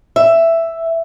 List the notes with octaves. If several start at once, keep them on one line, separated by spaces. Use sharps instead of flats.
E5